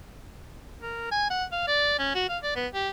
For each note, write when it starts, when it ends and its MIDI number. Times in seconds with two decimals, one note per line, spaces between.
0.81 1.08 70
1.11 1.29 80
1.30 1.44 78
1.52 1.64 77
1.67 1.95 74
1.99 2.12 61
2.15 2.25 66
2.29 2.38 77
2.43 2.56 74
2.56 2.67 59
2.73 2.89 67